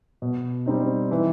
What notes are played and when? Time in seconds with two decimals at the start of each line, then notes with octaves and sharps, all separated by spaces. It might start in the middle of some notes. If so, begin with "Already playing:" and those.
0.22 B2
0.66 G3 C4 D#4
1.11 E3